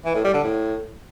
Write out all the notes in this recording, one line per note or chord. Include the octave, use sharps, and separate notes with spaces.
E3
A2
G3
D3
A2